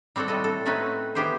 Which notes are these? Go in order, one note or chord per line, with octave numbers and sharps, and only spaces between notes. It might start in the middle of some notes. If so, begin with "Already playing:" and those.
G3 C4 F#4 A4 F#5
A2 G3 A4 D#5
A4
A3 C4 C#4 D#4 F#4 B4
B3 E4 G4 G#4 C5